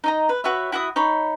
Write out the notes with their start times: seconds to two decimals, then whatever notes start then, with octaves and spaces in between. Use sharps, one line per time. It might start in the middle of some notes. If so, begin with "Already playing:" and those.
0.04 D#4 D#5 A#5
0.29 B4
0.44 F#4 B4 C#5 E5
0.72 E4 F#4 E5 D#6
0.96 D#4 C#5 B5